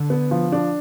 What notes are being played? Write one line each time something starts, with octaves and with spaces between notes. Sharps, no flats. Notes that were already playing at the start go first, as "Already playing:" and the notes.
Already playing: D3
B3
F3
D4